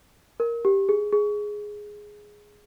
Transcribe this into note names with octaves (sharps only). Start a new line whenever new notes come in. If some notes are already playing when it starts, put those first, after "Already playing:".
A#4
G4
G#4
G#4